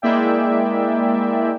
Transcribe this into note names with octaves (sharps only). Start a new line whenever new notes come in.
G#3 A#3 E4 D5 E5 G5